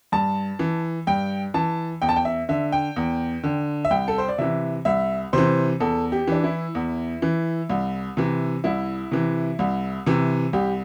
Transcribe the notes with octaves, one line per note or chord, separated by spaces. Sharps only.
G2 A5
E3
G2 G5
E3 A5
E2 G5
A5
G5
E5
D3 E5
G5
E2
D3
E5
C2 G5
A4
C5
D5
C3 E3 E5
C2 E5
C3 E3 C5
E2 A4
G4
E3 D4
E4
E2
E3
C2
C3 E3
C2 E4
C3 E3
C2
C3 E3
C2 G4